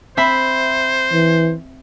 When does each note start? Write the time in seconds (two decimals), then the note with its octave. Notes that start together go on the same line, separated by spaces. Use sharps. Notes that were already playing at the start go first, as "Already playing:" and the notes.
0.17 C4 C5 E5 B5
1.12 E3